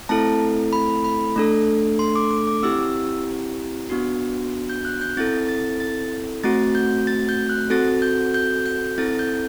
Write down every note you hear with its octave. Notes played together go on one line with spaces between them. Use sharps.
A3 C4 E4 A4 A5
B5
B5
A3 D4 A4
C6
D6
D6
D6
C4 E4 G4 E6
B3 D4 F#4
G6
F#6
G6
C4 E4 A4 A6
A6
A6
A3 C4 F#4 A6
G6
A6
G6
F#6
C4 F#4 A4 A6
G6
G6
G6
C4 E4 A4 A6
G6